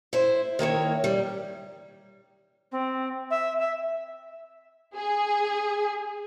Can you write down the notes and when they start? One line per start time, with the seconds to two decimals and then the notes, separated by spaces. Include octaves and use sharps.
0.13 E4 C5
0.59 D#3 A#3 E4 C#5
1.04 G3
2.72 C4
3.31 E5
3.59 E5
4.96 G#4